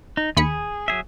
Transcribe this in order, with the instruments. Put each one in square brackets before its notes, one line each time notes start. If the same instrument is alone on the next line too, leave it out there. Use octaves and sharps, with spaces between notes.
[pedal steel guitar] D#4
[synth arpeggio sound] D#2 B5 C#7 [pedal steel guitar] G#4
[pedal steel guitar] F#3 G#4 E5